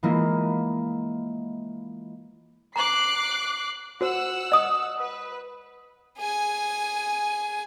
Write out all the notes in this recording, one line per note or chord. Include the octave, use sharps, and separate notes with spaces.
E3 G#3 A#3 E4 F4 D#5
A#5 D6 F#6 C7
F#4 C5 F#5 E6
D#5 D#6
B4
G#4 G#5